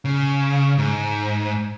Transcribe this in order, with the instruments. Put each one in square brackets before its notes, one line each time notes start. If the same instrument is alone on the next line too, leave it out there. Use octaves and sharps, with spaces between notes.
[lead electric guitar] C#3
G#2